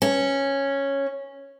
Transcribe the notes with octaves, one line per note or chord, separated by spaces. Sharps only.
C#4